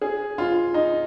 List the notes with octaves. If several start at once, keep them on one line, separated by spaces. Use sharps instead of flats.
G#4
F4
D#4